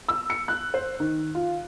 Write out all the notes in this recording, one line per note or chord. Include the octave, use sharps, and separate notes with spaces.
E6
C#7
F#6
C5
D#3
F4